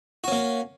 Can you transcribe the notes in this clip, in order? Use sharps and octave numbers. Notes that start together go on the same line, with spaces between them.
A#3 C#4 F#4